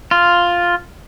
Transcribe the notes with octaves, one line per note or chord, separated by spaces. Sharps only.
F4